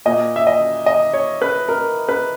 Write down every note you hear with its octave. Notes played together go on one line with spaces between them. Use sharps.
A#2 D#5
E5
D#5
D#5
C#5
B4
A#4
B4